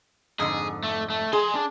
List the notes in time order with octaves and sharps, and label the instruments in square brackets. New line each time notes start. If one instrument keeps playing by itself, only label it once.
[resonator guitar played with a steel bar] F2 G#2 D3 [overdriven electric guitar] G#4
[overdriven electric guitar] A3
A3
[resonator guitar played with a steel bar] G#4 [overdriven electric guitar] G#5 C6
[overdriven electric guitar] D4